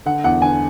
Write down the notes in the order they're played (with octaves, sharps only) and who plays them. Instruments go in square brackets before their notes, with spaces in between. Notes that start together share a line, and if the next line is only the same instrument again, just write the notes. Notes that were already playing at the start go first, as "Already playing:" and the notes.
[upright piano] D3 F#5
E2 F#5
D3 G#5